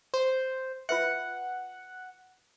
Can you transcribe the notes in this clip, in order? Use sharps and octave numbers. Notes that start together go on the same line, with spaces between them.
C5
F4 B4 E5 F#5